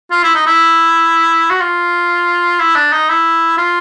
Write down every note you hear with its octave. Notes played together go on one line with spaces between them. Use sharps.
F4
E4
D#4
E4
F#4
F4
E4
D4
D#4
E4
F4